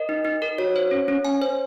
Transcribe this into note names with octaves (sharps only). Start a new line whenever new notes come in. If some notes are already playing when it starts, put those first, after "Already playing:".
Already playing: A#4 D#5
D#4
D#4
A#4
F#4 C#5
C5
C#4
C#4
G#5
C5